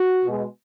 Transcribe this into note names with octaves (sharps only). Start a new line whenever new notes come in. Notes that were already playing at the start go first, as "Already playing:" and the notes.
Already playing: F#4
B2 G#3